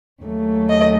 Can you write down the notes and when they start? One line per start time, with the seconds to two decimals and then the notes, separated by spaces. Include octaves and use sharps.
0.22 D#2 C#3 F#3 A3
0.69 D#5